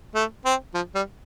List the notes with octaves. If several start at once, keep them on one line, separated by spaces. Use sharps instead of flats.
A3
C4
F3
G3